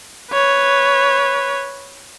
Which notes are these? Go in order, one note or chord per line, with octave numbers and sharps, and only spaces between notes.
B4 C#5